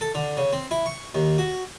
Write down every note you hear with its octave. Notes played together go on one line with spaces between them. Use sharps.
A4
D3
C#3
C4
E4
C#6
D#2
F#4